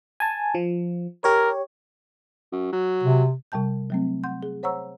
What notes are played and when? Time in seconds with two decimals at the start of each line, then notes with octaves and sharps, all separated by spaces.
0.20 G#5 A5
0.55 F3
1.24 G4 A#4 C#5
2.52 F#2
2.72 F#3
3.03 C3
3.52 C3 G3 G5 A5 G6
3.90 F#3 A3 C4
4.24 F#5 C6 G6
4.43 G#4
4.63 C5 C#5 F#5 A#5 C#6 E6